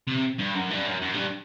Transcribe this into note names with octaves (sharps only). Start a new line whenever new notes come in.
C3
G2
F#2
G2
F#2
F#2
G2